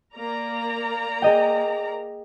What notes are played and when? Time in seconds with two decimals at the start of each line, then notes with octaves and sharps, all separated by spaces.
0.15 A#3 D5 A#5
1.22 G#4 D#5 G5